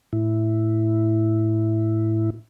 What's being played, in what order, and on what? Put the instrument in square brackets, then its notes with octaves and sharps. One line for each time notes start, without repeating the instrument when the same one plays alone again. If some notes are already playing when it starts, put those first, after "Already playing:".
[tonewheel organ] A2 E4